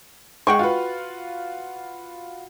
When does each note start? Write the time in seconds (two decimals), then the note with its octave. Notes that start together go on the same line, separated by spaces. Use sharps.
0.47 G#3 F#5 G5 C#6
0.59 F4 F#4 B4